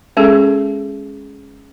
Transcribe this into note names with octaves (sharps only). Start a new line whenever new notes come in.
G#3 C#4 G#4 A4